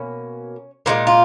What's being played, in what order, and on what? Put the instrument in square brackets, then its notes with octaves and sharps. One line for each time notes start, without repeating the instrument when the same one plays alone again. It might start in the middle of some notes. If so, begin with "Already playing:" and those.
Already playing: [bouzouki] B2 A#3 C#4
A#2 F3 G#3 D#4
F4